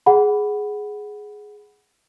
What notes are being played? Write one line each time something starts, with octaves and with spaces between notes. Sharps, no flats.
G#4 F#5 B5